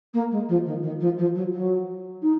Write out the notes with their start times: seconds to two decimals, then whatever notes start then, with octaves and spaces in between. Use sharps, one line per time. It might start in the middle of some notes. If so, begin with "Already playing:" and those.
0.13 A#3
0.31 G#3
0.48 F3
0.66 D#3
0.82 D#3
1.00 F3
1.18 F3
1.35 F#3
1.53 F#3
2.22 D#4